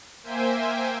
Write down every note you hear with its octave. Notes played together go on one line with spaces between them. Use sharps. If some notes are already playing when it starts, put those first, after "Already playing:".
A#3 C5 E5 G5 G#5